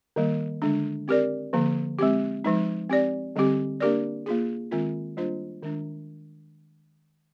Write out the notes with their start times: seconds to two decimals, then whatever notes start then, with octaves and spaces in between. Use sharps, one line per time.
0.16 D#3 G3 A#3
0.62 D3 G#3 D4
1.08 C4 G4 A#4 D5
1.53 D3 F3 A#3
1.99 G#3 C4 G4
2.44 F3 G#3 D#4
2.90 C4 G4 D5
3.36 D3 G3 C4 G4
3.80 A#3 D4 G4 A#4 D5
4.26 A#3 F4 G#4
4.71 D#3 G#3 C4 F4
5.17 G3 A#3 D4 F4 C5
5.63 D#3 G#3 D4